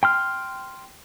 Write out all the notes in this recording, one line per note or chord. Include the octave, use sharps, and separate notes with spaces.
G5 C6 F6